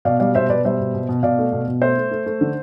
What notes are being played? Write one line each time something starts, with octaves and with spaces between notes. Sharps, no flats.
B2 D5 F5
G3 D5 F5
B2 C5 E5
B2 B4 D5
G3 C5 E5
B2
B2
B2
B2 D5 F5
A3
B2
B2
A3 C5 E5
A3
A3
A3
D3